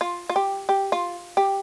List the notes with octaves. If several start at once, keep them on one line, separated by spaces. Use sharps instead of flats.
F4
F4
G4
G4
F4
G4